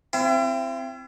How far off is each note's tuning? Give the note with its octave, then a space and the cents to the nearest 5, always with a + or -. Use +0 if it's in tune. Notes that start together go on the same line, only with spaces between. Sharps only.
C4 +0 E4 +45